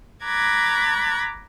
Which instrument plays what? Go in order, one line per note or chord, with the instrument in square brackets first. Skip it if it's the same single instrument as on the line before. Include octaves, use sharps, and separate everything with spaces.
[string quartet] A#5 B5 D6 F#6 G#6 A6